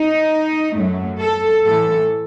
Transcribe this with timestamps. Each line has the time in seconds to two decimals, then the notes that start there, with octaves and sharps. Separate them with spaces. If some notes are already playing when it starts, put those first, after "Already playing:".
Already playing: D#4
0.75 F#2 F#3 A3
1.20 A4
1.65 A2 E3 A3 A4